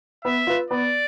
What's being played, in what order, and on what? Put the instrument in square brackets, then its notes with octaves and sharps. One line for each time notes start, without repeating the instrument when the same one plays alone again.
[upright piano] B3 [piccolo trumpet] E5
[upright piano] F4 B4
[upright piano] B3 [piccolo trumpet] D5